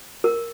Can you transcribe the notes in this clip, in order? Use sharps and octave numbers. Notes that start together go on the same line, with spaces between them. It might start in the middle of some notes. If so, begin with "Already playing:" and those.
A#4